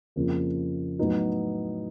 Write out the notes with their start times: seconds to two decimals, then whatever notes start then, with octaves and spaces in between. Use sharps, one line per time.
0.16 F2 C#3 F3 A#3
0.99 A2 F#3 B3 D#4 F#4